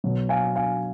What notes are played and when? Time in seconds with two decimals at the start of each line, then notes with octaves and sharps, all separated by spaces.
0.04 B2 F#3
0.29 F5 G#5
0.56 F5 G#5